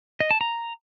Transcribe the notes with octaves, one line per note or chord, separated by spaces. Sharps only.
D#5
A5
A#5